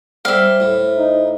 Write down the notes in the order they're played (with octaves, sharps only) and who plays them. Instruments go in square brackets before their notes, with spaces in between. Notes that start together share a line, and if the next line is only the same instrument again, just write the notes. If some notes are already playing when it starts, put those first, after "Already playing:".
[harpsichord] G3 [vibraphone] C5 [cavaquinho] E5 F5
[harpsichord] A2
[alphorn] D#4